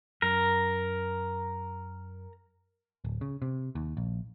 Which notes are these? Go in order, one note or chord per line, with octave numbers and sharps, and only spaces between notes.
F#2 A#4
D1
C#3
C3
D#2
A#1